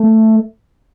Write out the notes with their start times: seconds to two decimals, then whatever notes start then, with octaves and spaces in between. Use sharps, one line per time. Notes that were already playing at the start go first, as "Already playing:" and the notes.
Already playing: A3